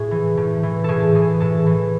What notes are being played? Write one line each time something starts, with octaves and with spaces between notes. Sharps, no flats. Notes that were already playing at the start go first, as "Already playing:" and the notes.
Already playing: A2 G#4
E3
A2
E3
A2 G#4 A4
E3 G#4
A2 A4
E3